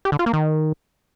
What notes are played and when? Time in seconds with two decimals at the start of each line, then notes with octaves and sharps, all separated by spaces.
0.05 G4
0.12 D3
0.19 F4
0.26 A#3
0.33 D#3